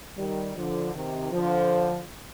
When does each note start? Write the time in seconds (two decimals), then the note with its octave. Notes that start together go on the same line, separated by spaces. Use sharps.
0.16 D#3 G3
0.55 D3 F3
0.94 C3 D#3
1.32 D3 F3